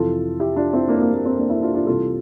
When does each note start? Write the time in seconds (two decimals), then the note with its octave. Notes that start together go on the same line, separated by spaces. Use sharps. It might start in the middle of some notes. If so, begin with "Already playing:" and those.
Already playing: F2 C3 E3 F4 A4
0.40 E4 G4
0.56 D4 F4
0.73 C4 E4
0.88 A#3 D4
0.96 C4
1.02 A#3
1.14 A#3
1.25 C4
1.38 A#3 D4
1.50 C4 E4
1.62 D4 F4
1.74 D4 F4
1.87 C2 C3 E3 F4 A4